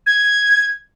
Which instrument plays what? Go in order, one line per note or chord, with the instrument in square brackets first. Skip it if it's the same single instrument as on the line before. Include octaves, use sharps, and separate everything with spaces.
[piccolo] G#6